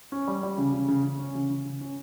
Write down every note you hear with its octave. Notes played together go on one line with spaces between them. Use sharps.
C#4
G3
G3
C#3
C#3
C#3
C#3
C#4
C#3
C#3
C#3
C#4